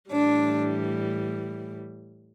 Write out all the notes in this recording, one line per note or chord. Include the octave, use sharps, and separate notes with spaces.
A2 E3 G3 D4